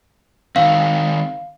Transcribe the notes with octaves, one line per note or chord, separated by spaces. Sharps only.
D#3 C4 F5